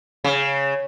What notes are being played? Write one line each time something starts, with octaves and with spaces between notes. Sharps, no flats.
C#3